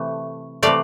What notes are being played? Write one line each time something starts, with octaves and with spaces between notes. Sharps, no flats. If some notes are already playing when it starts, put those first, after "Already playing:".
Already playing: C3 E3 A3
C3 E3 A3 D5 F5